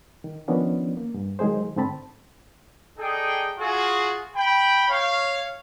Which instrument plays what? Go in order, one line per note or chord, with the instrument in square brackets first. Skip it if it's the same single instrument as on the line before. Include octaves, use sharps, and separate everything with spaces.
[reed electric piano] D#3
D#3 F3 B3 C#4 D4
A#3
G2
D#3 F#3 G#3 G#4 C5
G#2 D3 C4 A5 B5
[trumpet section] D#4 G#4 A4 D5 G5
F4 F#4 G#4
G5 B5
C#5 F5